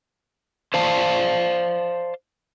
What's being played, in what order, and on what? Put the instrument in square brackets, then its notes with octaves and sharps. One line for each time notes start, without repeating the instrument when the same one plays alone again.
[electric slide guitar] C5 D5 F5 A5